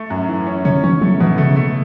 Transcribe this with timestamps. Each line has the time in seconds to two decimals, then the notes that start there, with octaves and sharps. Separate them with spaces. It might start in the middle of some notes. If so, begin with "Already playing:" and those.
Already playing: A3
0.10 F#2
0.28 E3
0.47 C#4
0.65 C#3 C#4
0.84 E3 C#4
1.02 F#3 A3
1.20 B2 E3
1.38 C#3 A3
1.56 A3